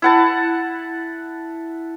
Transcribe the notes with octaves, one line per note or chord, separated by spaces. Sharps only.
E4 F#5 A5